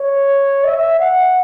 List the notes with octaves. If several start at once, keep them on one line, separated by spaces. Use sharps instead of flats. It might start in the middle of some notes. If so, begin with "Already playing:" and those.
Already playing: C#5
E5
F#5